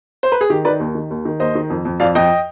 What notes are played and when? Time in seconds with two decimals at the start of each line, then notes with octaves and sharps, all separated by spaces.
0.23 C5
0.32 B4
0.41 G#4
0.50 D#3 G4
0.65 D#3 B4 D5
0.80 D#2
0.95 D#3
1.10 D#2
1.25 D#3
1.40 D#2 C5 D#5
1.55 D#3
1.70 F2
1.85 F2
2.00 F2 D5 F5
2.15 F2 D#5 G5